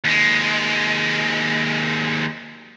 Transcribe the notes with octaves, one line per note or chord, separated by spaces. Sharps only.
D#2 G#3